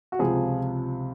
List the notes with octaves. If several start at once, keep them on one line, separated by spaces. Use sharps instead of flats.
F#4
C#2 C3 F3 G#4